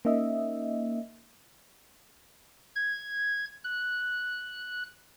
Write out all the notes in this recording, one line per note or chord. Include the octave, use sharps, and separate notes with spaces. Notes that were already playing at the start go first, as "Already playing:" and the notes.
A#3 C#4 D#4 D#5 E5
G#6
F#6